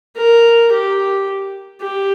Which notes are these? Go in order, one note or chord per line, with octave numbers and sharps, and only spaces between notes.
A#4
G4
G4